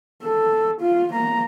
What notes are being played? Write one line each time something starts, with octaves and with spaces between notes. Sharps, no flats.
A4
F4
A#3 A#5